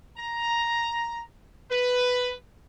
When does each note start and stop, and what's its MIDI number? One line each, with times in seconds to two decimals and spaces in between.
0.17 1.21 82
1.71 2.31 71